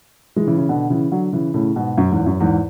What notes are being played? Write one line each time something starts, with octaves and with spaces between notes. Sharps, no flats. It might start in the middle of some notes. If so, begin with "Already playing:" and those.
E3 G#3
C#3 E3
C#3 E3
B2 D3
C#3 E3
D3 F#3
C#3 E3
A2 C#3
G#2 B2
F#2
E2 G#2
F#2
E2 G#2